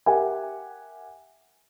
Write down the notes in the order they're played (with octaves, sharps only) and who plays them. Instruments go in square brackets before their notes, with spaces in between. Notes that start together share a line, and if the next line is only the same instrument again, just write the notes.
[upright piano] G4 A#4 E5 F#5 G#5